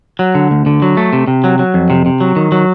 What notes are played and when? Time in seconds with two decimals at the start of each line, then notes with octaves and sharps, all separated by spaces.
0.19 F#3
0.35 D3
0.51 D2
0.66 D3
0.82 F#3
0.97 A3
1.13 C3
1.27 C3
1.44 F#3
1.59 F#3
1.74 F2
1.90 C3
2.06 C3
2.21 F#3
2.36 D#3
2.52 F#3